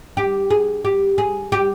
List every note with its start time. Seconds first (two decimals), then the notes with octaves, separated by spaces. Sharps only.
0.17 G4
0.51 G#4
0.85 G4
1.18 G#4
1.52 G4